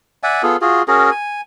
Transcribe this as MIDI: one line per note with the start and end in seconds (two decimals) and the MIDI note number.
0.23 0.42 74
0.23 0.42 76
0.23 0.42 78
0.23 0.42 80
0.43 0.57 59
0.43 0.57 65
0.43 0.57 68
0.43 0.57 69
0.61 0.82 65
0.61 0.82 66
0.61 0.82 68
0.88 1.10 61
0.88 1.10 66
0.88 1.10 68
0.88 1.10 70
1.11 1.41 80